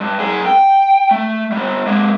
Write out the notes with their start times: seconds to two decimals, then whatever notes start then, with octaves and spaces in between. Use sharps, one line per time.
0.01 G2
0.20 F#2 G#4
0.46 G5
1.11 A3
1.52 G3 B3
1.87 G#3 A#3